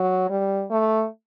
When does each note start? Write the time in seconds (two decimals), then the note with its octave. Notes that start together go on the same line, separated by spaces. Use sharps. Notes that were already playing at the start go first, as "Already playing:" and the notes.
Already playing: F#3
0.30 G3
0.70 A3